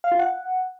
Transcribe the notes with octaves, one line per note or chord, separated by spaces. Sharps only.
F5
F4
F#5